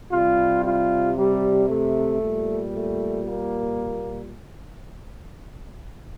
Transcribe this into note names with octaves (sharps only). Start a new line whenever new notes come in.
C3 G3 F4
F4
G3
A3
A#2 G3
A3
A#3